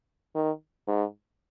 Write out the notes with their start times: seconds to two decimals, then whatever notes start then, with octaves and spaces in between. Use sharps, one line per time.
0.35 D#3
0.88 G#2